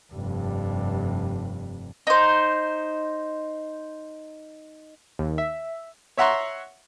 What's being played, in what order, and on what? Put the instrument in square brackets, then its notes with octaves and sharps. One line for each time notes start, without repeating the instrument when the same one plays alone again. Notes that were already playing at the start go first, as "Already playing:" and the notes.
[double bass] F1 G2
[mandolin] D#4 C5
[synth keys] D#2
E5
[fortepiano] C#5 E5 F#5 A#5 C6 C#6